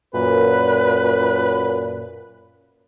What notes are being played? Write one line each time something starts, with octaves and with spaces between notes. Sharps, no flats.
F#2 A#2 B4